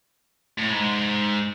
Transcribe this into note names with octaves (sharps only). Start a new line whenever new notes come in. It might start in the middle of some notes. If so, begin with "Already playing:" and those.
A2
G#2